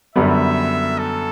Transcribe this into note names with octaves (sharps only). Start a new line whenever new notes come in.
F#2 D3 G3 B3 E5
A4